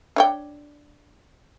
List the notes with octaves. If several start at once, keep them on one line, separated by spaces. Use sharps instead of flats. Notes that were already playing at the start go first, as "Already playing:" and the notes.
D4 C#5 G5